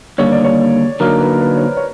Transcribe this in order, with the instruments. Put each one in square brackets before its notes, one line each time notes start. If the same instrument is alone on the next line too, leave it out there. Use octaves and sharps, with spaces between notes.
[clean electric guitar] D#2 D3 G3 A#3 [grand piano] C#5
[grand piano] D5
C#5
[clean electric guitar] D3 F#3 A#3 D#4 [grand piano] A#4
[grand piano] B4
B4
C#5
C5
C#5